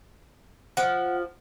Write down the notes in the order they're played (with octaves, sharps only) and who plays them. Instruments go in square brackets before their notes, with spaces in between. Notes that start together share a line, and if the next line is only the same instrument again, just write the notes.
[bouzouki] F3 [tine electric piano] F#5